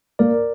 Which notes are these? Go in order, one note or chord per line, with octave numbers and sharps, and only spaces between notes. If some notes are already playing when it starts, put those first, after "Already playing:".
A#3 A#4 D5